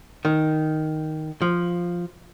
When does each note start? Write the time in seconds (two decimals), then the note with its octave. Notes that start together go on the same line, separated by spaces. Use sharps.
0.25 D#3
1.42 F3